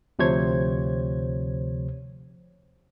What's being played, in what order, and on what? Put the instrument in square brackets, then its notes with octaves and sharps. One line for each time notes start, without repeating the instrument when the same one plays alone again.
[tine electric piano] D2 C3 F3 C5 C#5 G#6